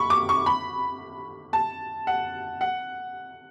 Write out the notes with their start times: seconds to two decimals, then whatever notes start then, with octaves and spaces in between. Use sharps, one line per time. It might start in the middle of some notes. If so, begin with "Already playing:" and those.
Already playing: B5 C#6
0.10 D6
0.29 C#6
0.46 B5
1.53 A5
2.07 F#5
2.61 F#5